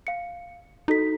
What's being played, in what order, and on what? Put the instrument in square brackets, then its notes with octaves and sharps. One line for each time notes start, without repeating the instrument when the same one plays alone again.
[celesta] F5 C#7
[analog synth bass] D#4 [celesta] F#4 A4 B6